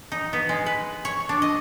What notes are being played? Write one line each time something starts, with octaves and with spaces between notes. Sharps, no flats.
D#4
B3
G#3
B4
C#5
D4
D#5